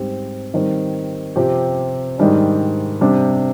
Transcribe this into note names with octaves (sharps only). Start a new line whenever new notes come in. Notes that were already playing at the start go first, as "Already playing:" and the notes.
Already playing: G#2 G3 C4 G4
D#3 G3 C4
C3 F3 C4 G4
G#2 D#3 G3 D4
C3 G3 D4